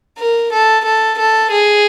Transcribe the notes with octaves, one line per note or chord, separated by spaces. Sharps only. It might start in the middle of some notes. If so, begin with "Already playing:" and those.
A#4
A4
A4
A4
G#4